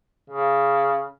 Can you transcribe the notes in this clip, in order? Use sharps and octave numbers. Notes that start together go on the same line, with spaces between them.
C#3